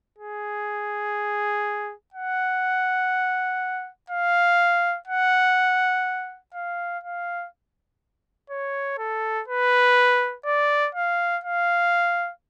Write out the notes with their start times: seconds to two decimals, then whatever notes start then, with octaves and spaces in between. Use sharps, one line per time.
0.18 G#4
2.14 F#5
4.10 F5
5.08 F#5
6.54 F5
7.04 F5
8.50 C#5
8.99 A4
9.48 B4
10.46 D5
10.95 F5
11.44 F5